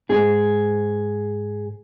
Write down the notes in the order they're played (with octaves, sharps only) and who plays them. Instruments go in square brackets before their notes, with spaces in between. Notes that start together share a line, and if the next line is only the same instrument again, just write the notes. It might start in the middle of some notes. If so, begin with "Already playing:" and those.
[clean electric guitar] G#2 G#4